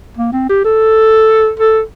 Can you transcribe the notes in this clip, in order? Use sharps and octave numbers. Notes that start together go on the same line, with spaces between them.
A#3
C4
G4
A4
A4